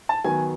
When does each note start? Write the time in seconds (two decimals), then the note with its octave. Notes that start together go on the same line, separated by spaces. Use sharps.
0.09 A5
0.24 D#3 F#3 B3 G#5